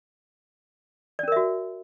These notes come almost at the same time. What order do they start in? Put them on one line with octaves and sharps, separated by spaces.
D5 C#4 A#4 E5 F#4